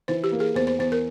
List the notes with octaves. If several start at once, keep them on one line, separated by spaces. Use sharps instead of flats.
E3 C5
G4
A#3
G#4
E2 C5
C5
E2 C5
A#4